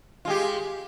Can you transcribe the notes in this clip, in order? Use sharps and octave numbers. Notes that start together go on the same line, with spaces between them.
G#3 F4 G4